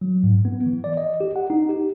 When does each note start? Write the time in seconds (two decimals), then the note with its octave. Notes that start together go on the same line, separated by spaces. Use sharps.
0.01 F#3
0.23 G#2
0.45 B3
0.66 E3
0.84 D5
0.97 D#5
1.21 G4
1.36 F#5
1.50 D#4
1.69 G4